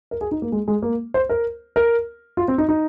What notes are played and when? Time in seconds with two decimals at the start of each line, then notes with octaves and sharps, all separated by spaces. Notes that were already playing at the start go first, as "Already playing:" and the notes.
0.11 A#4
0.21 G#4
0.31 D#4
0.42 A#3
0.52 G#3
0.68 G#3
0.82 A#3
1.14 C5
1.29 A#4
1.76 A#4
2.37 F4
2.48 C4
2.58 D#4
2.69 D#4